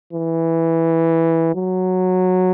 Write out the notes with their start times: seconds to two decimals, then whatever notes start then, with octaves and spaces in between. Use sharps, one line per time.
0.13 E3
1.55 F#3